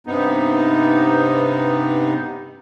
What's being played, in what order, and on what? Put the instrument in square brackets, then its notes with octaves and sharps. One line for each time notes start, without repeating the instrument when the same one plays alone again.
[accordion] G2 C3 B3 D#4